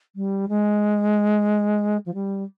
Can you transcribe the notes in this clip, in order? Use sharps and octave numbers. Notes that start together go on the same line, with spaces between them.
G3
G#3
F3
G3